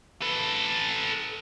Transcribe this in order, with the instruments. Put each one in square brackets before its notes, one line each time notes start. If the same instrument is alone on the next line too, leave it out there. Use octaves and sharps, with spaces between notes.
[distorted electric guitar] A4 B4